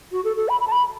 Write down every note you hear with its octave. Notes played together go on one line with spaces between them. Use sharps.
F#4
A4
A4
B5
B5
A5
B5